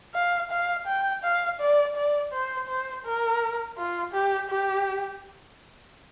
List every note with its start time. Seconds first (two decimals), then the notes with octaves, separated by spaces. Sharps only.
0.15 F5
0.51 F5
0.87 G5
1.24 F5
1.60 D5
1.96 D5
2.32 C5
2.68 C5
3.05 A#4
3.78 F4
4.14 G4
4.50 G4